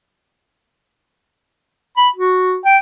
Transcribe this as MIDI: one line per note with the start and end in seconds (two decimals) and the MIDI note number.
1.97 2.09 83
2.16 2.56 66
2.65 2.78 79